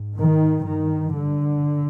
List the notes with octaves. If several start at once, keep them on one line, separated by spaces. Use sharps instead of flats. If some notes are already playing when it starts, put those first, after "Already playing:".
Already playing: G#2
D#3
G2 D#3
D3